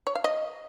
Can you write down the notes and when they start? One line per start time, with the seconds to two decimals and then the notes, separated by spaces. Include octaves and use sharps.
0.07 C#5
0.15 F5
0.24 D#5